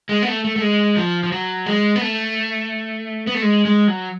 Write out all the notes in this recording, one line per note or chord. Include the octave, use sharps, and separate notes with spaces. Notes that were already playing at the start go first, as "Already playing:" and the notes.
G#3
B3
A3
A3
A3
G#3
F3
F3
F#3
G#3
B3
A3
B3
A3
G#3
G#3
F#3